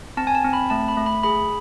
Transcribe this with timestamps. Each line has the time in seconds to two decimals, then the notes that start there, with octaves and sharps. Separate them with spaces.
0.17 C4 A5
0.27 G#5
0.35 A5
0.44 C4
0.53 B5
0.70 A3 A5
0.88 B5
0.97 A3
1.06 B5
1.23 G#4 B5